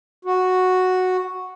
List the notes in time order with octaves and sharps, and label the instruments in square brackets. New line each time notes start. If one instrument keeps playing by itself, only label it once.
[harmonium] F#4